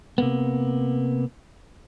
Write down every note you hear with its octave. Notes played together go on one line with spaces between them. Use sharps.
C3 A#3 B3